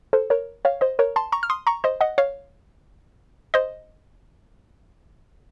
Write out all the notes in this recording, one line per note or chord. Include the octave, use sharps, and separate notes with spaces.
A4 C5
A#4 C#5
C#5 F5
C5 D#5
A#4 C#5
A5 C6
A#5 C#6
F6
C6 D#6
A#5 C#6
C5 D#5
D#5 F#5
C#5 F5
C5 D#5